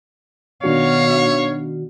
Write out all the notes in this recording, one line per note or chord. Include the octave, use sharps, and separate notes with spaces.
B2 D#3 D4 F#4 C#5 F5